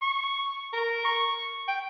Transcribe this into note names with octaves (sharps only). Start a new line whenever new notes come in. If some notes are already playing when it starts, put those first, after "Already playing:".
C#6
A#4
C#6
G5